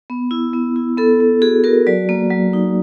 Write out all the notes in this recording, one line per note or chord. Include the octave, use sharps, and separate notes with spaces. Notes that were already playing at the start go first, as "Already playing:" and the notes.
B3
E4
B3
E4
B3 A4
B3
F#4 G#4
F#4 A#4
F#3 D5
A#3
F#3
D#4